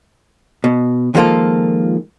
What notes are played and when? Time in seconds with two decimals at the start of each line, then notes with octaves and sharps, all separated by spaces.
0.64 B2
1.15 D#3 F3 G#3 A#3 F4 A4